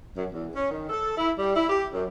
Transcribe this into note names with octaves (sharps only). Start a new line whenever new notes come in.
F#2
E2
C#4
D#3
A4
E4
G3
E4
G4
F#2